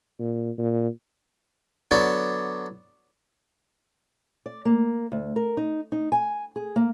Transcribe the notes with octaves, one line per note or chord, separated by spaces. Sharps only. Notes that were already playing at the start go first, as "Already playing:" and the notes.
A#2
A#2
D3 F#3 B3 D4
D5
A#3
D2
A#4
D#4
D#4
G#5
G#4
A#3